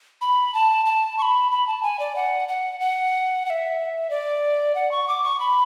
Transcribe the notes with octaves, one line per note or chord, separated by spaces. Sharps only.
B5
A5
A5
C#6
B5
B5
A5
G#5
D5
F#5
F#5
F#5
F#5
E5
D5
F#5
C#6
D6
C#6
B5